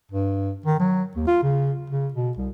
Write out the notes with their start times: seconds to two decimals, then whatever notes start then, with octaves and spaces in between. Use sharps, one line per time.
0.11 G2
0.66 D#3
0.80 F#3
1.16 D#2
1.27 F4
1.43 C#3
1.90 C#3
2.14 B2
2.38 C2